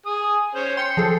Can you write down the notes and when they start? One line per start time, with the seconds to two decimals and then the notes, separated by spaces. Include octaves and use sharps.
0.06 G#4 D#6
0.55 C#4 C5 C#5
0.77 G5 C6 C#7
0.97 F3 G#4 A4